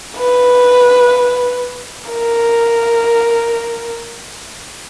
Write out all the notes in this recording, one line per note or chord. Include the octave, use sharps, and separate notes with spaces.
B4
A#4